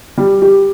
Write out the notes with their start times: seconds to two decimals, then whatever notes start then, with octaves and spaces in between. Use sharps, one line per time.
0.18 G3
0.42 G4